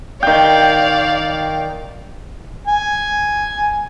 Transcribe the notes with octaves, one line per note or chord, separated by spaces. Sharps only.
D#3 D5 F5 G5
G#5